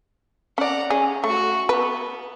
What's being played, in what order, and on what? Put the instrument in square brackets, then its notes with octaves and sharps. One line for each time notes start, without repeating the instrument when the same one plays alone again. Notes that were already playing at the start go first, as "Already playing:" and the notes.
[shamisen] C#4 D5 [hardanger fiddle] F#5 A#5
[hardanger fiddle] C#4 [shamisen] G#4
[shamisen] A3 [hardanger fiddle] F#4 C#6
[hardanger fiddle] B3 [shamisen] B4